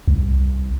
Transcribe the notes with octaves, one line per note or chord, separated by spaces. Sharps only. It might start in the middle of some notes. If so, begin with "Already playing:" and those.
C2